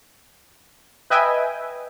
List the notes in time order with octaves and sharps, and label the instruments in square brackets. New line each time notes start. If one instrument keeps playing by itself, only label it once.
[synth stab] B4 D#5 E5 G5 G#5